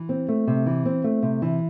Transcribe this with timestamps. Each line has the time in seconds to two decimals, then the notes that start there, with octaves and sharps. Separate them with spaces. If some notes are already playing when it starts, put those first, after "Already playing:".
Already playing: E3
0.09 C4
0.28 A3
0.47 C3
0.66 E3
0.85 C4
1.04 A3
1.22 C3
1.42 E3